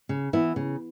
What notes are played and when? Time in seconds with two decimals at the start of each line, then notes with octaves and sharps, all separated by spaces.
0.09 C#3
0.33 E3 B3 E4
0.56 C#3